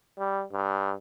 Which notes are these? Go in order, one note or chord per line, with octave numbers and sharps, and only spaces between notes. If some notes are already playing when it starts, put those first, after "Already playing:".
G3
G2